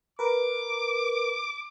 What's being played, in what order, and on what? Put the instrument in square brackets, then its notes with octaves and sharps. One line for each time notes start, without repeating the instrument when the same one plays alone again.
[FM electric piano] A#4 B4 [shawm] D6